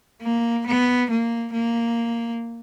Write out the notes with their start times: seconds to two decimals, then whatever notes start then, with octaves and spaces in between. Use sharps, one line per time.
0.22 A#3
0.67 B3
1.10 A#3
1.53 A#3